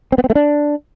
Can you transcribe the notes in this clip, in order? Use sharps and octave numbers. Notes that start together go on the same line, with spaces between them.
C4
B3
C4
A3
D4